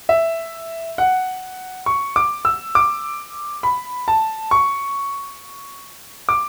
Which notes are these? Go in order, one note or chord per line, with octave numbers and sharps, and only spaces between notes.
E5
F#5
C#6
D6
E6
D6
B5
A5
C#6
D6